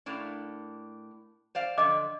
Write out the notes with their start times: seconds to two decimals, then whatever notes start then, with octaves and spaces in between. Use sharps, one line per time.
0.06 A2 A#3 D4
1.55 C5 D5 F5
1.78 D3 F3 D#5 D6